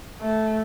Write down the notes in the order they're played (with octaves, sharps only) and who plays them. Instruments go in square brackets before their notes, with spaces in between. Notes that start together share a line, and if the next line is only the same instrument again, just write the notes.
[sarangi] A3